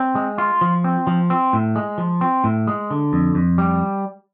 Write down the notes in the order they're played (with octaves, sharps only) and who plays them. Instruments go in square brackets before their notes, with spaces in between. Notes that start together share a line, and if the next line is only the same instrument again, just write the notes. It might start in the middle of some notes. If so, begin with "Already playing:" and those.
Already playing: [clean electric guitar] C4
G#3
F4
F3
C4
F3
C4
A2
G#3
F3
C4
A2
G#3
D3
F2
F2
G3